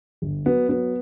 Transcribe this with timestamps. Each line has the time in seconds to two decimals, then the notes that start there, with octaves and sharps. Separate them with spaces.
0.22 G1
0.46 F#3 B3
0.69 F#3 B3